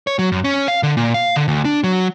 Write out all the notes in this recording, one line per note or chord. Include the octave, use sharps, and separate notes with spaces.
C#5
F#3
F#2
C#4
F5
D3
A#2
F5
D3
D2
D4
F#3